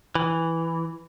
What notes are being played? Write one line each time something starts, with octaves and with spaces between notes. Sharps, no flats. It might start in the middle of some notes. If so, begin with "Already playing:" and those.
E3